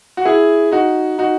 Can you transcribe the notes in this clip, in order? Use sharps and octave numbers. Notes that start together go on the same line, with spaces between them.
F#4
E4 G#4
D#4 F#4
D#4 F#4